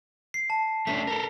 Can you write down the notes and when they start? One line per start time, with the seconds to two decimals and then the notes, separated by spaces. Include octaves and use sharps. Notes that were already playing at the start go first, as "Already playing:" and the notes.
0.34 C7
0.50 A5
0.87 A3 C#4 D4 B6
1.07 A4 A#4